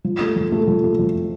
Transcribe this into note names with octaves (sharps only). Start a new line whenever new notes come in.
F3
A3
F2
A3
F3
A3
F2